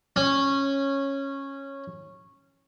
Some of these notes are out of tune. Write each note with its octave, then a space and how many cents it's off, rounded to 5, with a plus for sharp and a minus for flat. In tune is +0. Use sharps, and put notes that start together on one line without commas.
C#4 -10